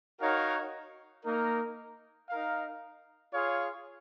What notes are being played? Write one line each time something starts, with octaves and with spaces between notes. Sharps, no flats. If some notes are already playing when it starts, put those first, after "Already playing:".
D#4 F#4 A#4 C#5 F5
A#3 D#4 A#4
D#4 A#4 F5
F4 G#4 C#5 F5